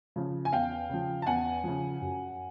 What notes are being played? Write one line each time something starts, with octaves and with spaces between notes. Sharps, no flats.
C#3 F3
G#5
E2 F5 G5
C#3 F3
A5
E2 F#5 G#5
C#3 F3
F#2